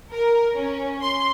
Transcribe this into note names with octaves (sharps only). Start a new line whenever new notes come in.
A#4
C#4
C6